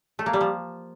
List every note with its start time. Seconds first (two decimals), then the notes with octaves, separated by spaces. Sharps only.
0.19 A3
0.26 A#3
0.33 G3
0.41 F3